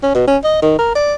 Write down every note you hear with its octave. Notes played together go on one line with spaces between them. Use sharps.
C#4
B2
C#4
D#5
D#3
A#4
D5